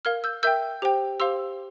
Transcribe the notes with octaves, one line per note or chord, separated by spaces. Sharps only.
A#4 F5 F6 G#6
E6 G6
A#4 E5 G5 E6 G6
G4 C5 G5
G4 C5 F5 C6 E6